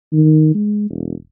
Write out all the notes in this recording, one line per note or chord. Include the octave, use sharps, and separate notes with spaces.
D#3
G#3
E1